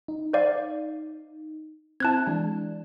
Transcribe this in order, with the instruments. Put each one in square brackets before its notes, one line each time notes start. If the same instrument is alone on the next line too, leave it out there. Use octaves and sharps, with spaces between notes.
[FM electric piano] D#4
[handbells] C5 D5 F5
[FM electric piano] C4 E4 [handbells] A5 F#6 G#6
[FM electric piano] E3 G#3 D4 [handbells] A5